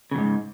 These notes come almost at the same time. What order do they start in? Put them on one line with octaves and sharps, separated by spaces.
C#3 E2 G#2